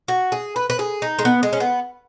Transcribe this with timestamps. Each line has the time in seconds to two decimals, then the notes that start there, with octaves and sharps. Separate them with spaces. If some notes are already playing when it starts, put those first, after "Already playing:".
0.08 F#4
0.32 G#4
0.56 B4
0.70 B4
0.79 G#4
1.02 D#4
1.19 G#3
1.25 B3
1.43 G#3
1.53 C#4
1.60 B3